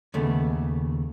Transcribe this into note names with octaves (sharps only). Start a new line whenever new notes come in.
D#2 C#3 A3 B3